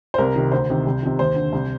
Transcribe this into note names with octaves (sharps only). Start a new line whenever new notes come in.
C5
C2 A#4
C3 D#3
D2 C5
C3 D#3
C2
C3 D#3
D#2 C5
D3
C2